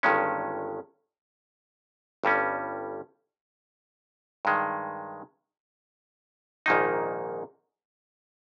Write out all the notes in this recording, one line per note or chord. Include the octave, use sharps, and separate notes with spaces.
G1 G2 D#3 G#3 C#4
G1 G2 G3 C#4
G2 D#3 G#3
A#1 G#2 D#3 A#3 D#4